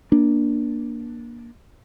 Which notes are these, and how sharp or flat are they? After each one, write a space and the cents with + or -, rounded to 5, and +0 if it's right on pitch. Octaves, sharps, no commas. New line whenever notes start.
A#3 +20 D4 +0